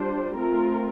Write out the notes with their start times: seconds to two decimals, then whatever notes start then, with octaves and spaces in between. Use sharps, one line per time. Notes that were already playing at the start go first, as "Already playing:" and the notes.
Already playing: G3 D4 F4 C5
0.36 A3 C4 F4 A#4